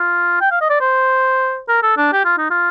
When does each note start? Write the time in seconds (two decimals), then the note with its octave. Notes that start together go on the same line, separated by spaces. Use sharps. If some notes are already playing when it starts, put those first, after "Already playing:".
Already playing: F4
0.41 G5
0.51 F5
0.61 D#5
0.70 D5
0.81 C5
1.68 A#4
1.83 A4
1.97 D4
2.13 G4
2.25 F4
2.38 D#4
2.51 F4